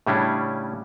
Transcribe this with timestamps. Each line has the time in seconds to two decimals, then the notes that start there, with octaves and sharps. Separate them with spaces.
0.07 A2 C#3 G3 C#4 D4 E4